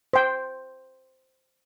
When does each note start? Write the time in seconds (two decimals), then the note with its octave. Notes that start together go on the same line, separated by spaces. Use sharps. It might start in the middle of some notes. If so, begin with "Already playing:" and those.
0.13 C5 G5